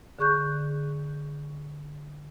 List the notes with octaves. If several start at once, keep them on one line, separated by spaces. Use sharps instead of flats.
D3 G#4 C#6 F#6 G6